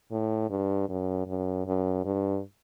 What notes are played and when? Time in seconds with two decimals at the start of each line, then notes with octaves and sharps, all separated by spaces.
0.11 A2
0.50 G2
0.89 F#2
1.27 F#2
1.66 F#2
2.05 G2